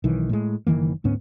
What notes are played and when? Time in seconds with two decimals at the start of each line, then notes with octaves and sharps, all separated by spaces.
0.04 B1 D#3 E3
0.29 A2 G#3
0.67 F#1 D#3 E3 A#3
1.04 D2 G#2 B3 C#4